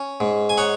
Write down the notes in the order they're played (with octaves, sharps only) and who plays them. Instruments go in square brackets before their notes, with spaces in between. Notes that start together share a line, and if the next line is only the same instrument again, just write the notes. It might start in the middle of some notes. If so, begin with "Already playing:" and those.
Already playing: [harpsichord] C#4
G#2
G#5
D#4 C#5 F#5